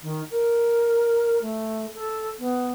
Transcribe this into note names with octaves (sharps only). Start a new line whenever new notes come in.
D#3
A#4
A3
A4
B3